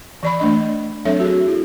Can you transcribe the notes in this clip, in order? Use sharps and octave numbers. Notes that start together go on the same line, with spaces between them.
E3 D5 B5
A3 D4 D#5
F#3 C4 D4 A4 C#5 E5
F#4 G#4
E4